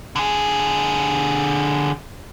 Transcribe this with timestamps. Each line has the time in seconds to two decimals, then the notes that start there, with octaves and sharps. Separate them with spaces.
0.16 D3 G#4